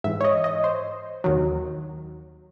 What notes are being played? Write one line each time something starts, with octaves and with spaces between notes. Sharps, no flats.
G#2 E3 E5
C#5
D#5
D#5
C5
D#2 D#3 F#3